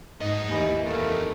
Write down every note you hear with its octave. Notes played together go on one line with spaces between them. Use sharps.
G#2 B3 D#4 D#5
D#2 E3 G4 G#5 B5
F2 A2 A3 A4 A#4 F5